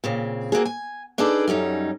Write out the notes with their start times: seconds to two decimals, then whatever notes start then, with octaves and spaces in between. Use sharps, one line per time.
0.04 A#2 C#3 C4
0.52 A#3 C4 F#4 G#4
0.65 G#5
1.18 D4 D#4 G#4 A4 B4 D5
1.47 F#2 G3 C#4 D#4